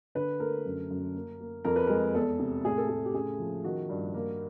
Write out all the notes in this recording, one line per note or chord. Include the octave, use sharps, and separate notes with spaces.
D3 B4
A3 A#4
F#2
F#2
A#3
A#3
F2 A#4
B4
G#3 A#4
E2 A4
C3
A2 G#4
A4
A3 G#4
G4
C#3 G#4
F3
D#3 F#4
G2
A#3